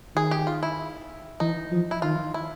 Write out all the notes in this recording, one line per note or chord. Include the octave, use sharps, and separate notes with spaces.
D#3 G#4
G4
F4
E4
E3 D#4
F3
E4
D#3 F4
E4